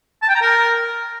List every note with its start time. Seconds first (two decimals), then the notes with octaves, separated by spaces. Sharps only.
0.22 A5
0.29 G5
0.35 A#5
0.42 A#4